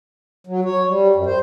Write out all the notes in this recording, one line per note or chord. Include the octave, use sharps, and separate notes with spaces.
F#3
C#5
G3
F#2
C5